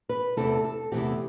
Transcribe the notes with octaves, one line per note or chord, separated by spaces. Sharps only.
B4
E2 C3 E3 A3 C4 A4
A4
E2 C3 E3 A3 C4 G4